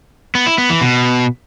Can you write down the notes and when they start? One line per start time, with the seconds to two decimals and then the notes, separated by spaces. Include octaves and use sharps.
0.35 B3
0.47 E4
0.58 B3
0.70 E3
0.81 B2